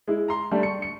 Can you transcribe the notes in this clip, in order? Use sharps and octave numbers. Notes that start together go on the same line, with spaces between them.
G#3 E4
A#5 C6
G3 A3 D4
C#6 C#7
C#7